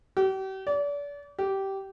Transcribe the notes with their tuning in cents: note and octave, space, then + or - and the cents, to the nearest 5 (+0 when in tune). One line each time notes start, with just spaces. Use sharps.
G4 -40
D5 -35
G4 -15